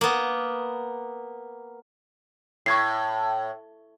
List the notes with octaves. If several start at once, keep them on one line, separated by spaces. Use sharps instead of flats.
A#3 B3
A2 C#6 G#6 C7